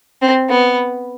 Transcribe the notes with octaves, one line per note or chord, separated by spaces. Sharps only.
C4
B3